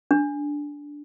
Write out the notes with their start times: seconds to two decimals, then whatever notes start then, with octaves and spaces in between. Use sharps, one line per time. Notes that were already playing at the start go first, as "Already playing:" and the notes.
0.11 D4